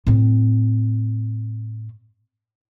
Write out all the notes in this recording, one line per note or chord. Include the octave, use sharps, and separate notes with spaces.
A2 C4